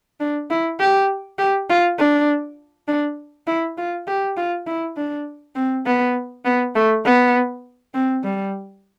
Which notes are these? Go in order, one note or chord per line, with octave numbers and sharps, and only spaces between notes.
D4
E4
G4
G4
F4
D4
D4
E4
F4
G4
F4
E4
D4
C4
B3
B3
A3
B3
C4
G3